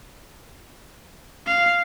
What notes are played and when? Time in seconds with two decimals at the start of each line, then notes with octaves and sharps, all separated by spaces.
1.47 F5